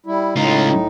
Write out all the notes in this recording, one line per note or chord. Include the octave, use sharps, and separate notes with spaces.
G3 E4
C#2 A2 D#4 F4